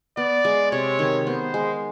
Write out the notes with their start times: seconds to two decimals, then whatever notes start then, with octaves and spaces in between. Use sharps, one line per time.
0.17 B3 D5
0.45 G#3
0.71 C3 C#5
0.99 D#3
1.27 B3 C5
1.54 G#3